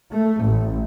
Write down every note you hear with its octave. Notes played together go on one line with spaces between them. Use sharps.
A3
A1